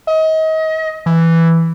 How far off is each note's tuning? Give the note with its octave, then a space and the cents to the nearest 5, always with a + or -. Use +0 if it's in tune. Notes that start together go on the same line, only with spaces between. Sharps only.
D#5 +30
E3 +5